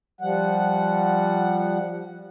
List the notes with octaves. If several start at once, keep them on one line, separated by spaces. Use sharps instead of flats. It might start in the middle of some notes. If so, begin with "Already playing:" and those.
F3 G3 F#5